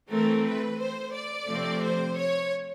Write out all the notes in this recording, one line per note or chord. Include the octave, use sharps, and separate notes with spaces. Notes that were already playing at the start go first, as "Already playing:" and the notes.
E3 A3 C4 A#4
B4
C5
D5
C3 F3 A3 C4
C5
C#5